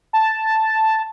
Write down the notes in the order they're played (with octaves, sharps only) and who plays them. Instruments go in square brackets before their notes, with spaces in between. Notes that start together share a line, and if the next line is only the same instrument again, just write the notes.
[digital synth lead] A5